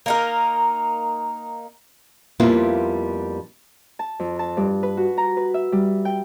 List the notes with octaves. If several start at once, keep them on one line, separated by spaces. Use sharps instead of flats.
A#3 D#4 A#4
F2 G3 A#3 B3 E4 F4
A5
F2
A5
G2
B4
F#4
A#5
B4
E5
G3
G5